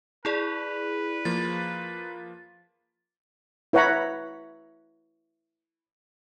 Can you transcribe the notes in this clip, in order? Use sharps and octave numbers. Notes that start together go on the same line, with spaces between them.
E4 G#4 B4 D5
F3 A#3 A6
E4 B4 C#5 F#5 A#5 B5